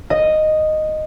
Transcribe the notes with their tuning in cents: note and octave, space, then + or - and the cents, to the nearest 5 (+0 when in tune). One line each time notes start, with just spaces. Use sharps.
D#5 -5